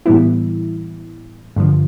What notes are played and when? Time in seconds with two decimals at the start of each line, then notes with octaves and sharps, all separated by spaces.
0.06 A2 E3 G3 B3 E4
1.56 G2 D3 F3